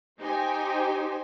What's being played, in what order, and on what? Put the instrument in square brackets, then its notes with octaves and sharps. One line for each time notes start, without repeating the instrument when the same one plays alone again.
[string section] D#4 G4 C5 G5 G#5